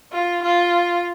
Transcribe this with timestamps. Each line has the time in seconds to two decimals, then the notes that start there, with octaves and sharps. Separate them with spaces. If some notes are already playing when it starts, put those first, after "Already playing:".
0.12 F4
0.43 F4